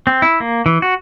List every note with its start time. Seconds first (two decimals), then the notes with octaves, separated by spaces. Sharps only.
0.07 C4
0.22 E4
0.40 A#3
0.66 E3
0.82 F#4